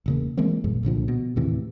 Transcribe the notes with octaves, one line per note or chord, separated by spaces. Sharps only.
E1 C#3 A#3
E3 G#3 A#3 C4
G#1 F#2 A#2 G#3
C2 A#2 D3 F3
B2
D#2 A2 C3 E3